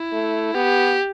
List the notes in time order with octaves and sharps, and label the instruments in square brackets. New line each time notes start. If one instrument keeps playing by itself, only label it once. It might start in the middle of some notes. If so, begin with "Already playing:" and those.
Already playing: [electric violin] E4
[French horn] A3
[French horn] B3 [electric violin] G4